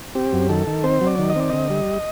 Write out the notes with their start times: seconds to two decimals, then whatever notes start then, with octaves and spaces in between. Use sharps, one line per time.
0.15 C4 G4
0.33 F#2
0.49 D#3 A4
0.67 D#3
0.84 C4 C5
1.01 F#3
1.07 D5
1.19 D#3
1.30 D#5
1.36 C4 D5
1.50 D3 D#5
1.70 G3